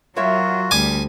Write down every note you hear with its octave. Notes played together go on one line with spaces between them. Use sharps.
F#3 F4 F#4 A#4 C#5 E5
D2 G3 G#5 D6